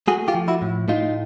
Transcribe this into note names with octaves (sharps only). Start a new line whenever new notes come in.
A3 F#4 G#4
F4 G4
F3
E4 F#4
A2
A2 D#4 F4